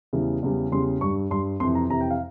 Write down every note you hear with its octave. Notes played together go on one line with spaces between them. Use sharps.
E2 C#3 E3 G3
E2 C#3 G3
E2 C#3 G3 C6
G2 G3 C#6
G2 G3 C6
F2 C3 E3 C6
A#5
F2 C3 E3 A#5
G5
F5